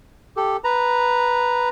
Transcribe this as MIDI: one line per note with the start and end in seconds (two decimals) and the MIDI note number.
0.37 0.57 67
0.37 0.57 69
0.64 1.69 71
0.64 1.69 82